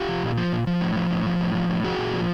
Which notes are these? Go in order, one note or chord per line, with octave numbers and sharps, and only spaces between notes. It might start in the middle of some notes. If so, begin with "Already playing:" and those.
Already playing: F4 G4
F3
A#2
F3
A#2
F3
A2
F3
A2
F3
A2
F3
A2
F3 F#4 G#4
A#2
F3